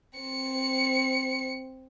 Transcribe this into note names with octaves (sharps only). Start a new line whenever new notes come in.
C4 C#7